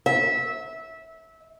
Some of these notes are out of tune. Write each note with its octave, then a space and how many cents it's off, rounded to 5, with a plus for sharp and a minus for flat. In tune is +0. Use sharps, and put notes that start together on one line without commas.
E5 -20